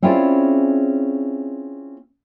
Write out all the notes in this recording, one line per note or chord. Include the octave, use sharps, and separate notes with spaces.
C4 C#4 E4 F4 G#4 D5